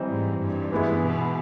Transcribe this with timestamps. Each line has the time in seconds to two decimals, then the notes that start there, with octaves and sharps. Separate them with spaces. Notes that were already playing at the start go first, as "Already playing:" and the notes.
Already playing: E3 G3 C4 D#4
0.08 G#2
0.40 G2
0.72 E3 G#3 B3 E4
1.02 B2